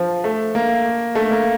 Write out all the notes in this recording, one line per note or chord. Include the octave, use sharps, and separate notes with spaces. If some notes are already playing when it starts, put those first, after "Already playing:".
Already playing: F3
A3
A#3
A3
A#3